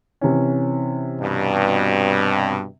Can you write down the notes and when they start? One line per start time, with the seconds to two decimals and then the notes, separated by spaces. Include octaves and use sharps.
0.21 C3 E3 C#4
1.20 G2 B2